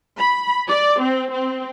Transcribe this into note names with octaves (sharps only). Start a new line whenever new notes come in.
B5
D5
C4
C4